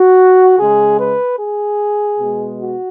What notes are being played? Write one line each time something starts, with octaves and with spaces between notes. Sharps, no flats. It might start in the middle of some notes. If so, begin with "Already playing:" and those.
Already playing: F#4
C#3 G#3 G#4
B4
G#4
B2 G#3
F#4